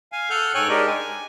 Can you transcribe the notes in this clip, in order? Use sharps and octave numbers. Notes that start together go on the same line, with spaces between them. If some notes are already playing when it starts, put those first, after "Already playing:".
F5 G#5
A4 F#5 F6 G6
G#2 A4 C#5 G5 G#5 F#6
G#3 D4 D#4 G4 A#4
G#5